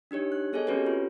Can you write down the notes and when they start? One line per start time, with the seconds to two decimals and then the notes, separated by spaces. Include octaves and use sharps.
0.11 D4 D#4 G4 C#5
0.32 F#6
0.53 B3 G#4 A4 C#5 D#5 G#5
0.67 C4 C#4 F#4 G4 B4 C#5
0.87 F4